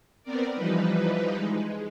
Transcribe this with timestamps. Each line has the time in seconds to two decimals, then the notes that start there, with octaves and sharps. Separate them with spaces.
0.23 B3 C4 A#4 D5
0.54 E3 F3 G3 D#4 B4
1.36 G#3